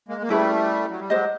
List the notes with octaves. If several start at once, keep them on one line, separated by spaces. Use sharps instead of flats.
G#3 A#3
A#3
G3 A3 C#4 E4 G#4 B4
F#3
G3
F#3 G#3 G4 C5 D#5